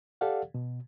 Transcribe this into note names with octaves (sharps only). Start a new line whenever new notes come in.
G4 A4 D5 F5 F#5
B2